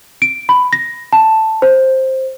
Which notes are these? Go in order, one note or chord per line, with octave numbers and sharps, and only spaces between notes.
D7
B5
A#6
A5
C5